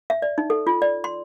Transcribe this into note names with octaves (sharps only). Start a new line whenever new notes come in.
E5
D5
D#4
A4
F4
D5
C6